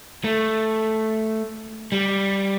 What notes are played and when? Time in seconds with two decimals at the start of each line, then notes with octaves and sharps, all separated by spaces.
0.24 A3
1.92 G3